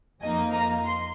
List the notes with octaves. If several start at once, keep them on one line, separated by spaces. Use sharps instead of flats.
F2 F3 A#3 D#4 D#5 G#5
F5 A#5
C6